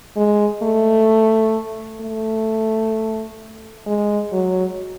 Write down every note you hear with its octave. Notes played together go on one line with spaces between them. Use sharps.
G#3
A3
A3
G#3
F#3